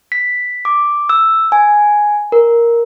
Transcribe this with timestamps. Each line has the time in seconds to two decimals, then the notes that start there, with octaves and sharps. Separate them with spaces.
0.12 B6
0.65 D6
1.09 E6
1.52 G#5
2.32 A#4